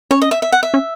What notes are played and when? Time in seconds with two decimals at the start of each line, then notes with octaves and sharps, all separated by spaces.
0.11 C#4 C#5
0.22 D#5
0.31 E5
0.42 E5
0.52 F#5
0.63 E5
0.74 C#4